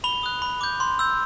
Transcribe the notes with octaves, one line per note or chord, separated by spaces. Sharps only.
B5 F7 G7
D#6 F#6
B5
D6 G6
C6
E6 G6